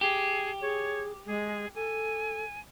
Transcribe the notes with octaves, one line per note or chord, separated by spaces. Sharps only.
G4 G#4
G#4 C#5
G#3 G#4
A4 G#5